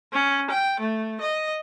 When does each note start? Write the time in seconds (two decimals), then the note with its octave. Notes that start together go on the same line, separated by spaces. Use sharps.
0.13 C#4
0.51 G5
0.80 A3
1.21 D#5